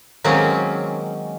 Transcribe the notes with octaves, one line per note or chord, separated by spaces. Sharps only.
D#3 F#3 G#3 A#3 C4 C#4